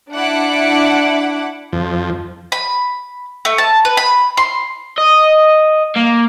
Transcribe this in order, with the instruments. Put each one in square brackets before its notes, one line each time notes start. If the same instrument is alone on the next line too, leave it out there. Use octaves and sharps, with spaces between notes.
[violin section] D4 E4 F#5 D6
[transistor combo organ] F2
[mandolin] B5
A3
A5
B4
B5
C6
[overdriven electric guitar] D#5
A#3